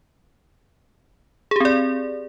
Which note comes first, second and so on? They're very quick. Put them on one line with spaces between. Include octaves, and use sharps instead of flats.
G#4 G4 C4 D5